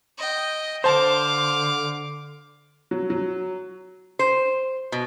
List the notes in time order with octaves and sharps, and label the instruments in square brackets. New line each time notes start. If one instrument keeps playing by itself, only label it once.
[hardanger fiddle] D#5 G5
[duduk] D3 [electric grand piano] C5 A5 [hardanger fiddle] F5 D6
[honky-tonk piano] F#3
F#3
[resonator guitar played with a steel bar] C5
B2